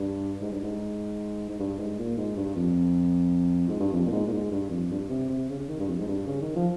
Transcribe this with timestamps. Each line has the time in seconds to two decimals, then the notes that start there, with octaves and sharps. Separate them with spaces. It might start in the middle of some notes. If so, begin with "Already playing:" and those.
Already playing: G2
0.42 G#2
0.52 G2
0.63 G#2
1.49 G#2
1.59 G2
1.79 G#2
1.99 A#2
2.18 G#2
2.37 G2
2.56 F2
3.68 G#2
3.80 G2
3.93 F2
4.06 A#2
4.12 G#2
4.28 A#2
4.32 G#2
4.51 G2
4.70 F2
4.91 G2
5.10 C3
5.29 C3
5.50 C#3
5.60 C#3
5.69 D#3
5.80 G2
5.89 F2
5.99 G#2
6.08 G2
6.27 C#3
6.42 D#3
6.56 F3